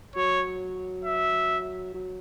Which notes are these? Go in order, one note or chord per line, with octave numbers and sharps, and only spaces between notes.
F#3 C#5
E5
F#3